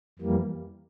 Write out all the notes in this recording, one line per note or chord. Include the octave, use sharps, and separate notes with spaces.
F2 E3 G3 A#3